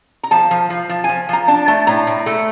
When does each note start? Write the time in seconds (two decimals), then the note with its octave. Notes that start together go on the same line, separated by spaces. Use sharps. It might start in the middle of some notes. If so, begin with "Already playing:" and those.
0.23 A#5
0.31 F3 A5
0.51 F3
0.70 F3
0.89 F3
1.04 G#5
1.09 F3
1.29 F3 A#5
1.48 D4 A5
1.68 A3 A5
1.87 A2 A#5
2.07 A2
2.26 A3